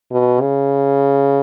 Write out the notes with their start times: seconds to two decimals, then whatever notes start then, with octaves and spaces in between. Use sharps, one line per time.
0.11 B2
0.41 C#3